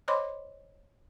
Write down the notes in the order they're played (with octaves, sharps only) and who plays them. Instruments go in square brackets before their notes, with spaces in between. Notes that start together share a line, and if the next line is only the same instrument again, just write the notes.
[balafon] C5 C#5 D#5 B5 C6 D6